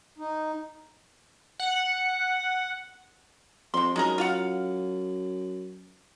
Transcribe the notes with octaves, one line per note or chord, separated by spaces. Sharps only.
D#4
F#5
F2 C3 C6
F#2 G#3 D#4 A#4
F4 F5 F#5